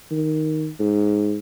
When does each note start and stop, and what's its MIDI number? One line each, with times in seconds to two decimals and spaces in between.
0.11 0.69 51
0.80 1.37 44